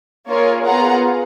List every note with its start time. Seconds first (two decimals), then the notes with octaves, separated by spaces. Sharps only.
0.28 A#3 F4 G#4 A#4 C#5
0.65 B3 F4 G#4 F#5 A#5